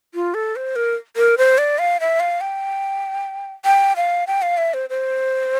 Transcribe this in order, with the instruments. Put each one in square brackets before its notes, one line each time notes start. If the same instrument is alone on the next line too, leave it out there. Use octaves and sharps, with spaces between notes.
[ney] F4
A4
C5
A#4
A#4
C5
D5
F5
E5
F5
G5
G5
F5
G5
F5
E5
C5
C5